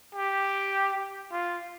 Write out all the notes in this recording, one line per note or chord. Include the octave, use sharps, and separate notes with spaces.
G4
F4